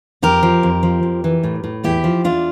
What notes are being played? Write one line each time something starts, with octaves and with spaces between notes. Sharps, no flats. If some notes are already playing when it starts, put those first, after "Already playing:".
F2 G4 A#4
F3
F2
F3
F2
E3
A2
A2
E2 E4 G4
F3
E2 D4 F4